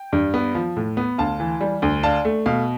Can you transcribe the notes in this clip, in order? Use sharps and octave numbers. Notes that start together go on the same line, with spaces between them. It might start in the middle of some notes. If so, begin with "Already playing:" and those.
Already playing: G5
G2
B3
F3
A2
B3
D2 F5 A5
E3
G3
D2
D4 F5 A5
A3
B2 F5